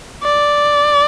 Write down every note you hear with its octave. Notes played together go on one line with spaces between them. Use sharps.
D5